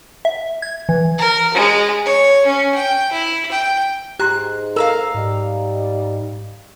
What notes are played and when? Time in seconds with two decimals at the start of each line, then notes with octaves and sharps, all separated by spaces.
0.25 E5
0.62 G#6
0.89 E3
1.18 A#4
1.54 G#3
2.05 C#5
2.46 C#4
2.75 G5
3.12 E4
3.51 G5
4.19 G#2 G4 A#5 C6 F#6
4.76 A4 A#4 F5 A#5 E6
5.14 G#2 G3 D#4